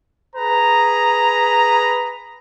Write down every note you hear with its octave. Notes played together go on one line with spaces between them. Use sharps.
G#4 B4 A#5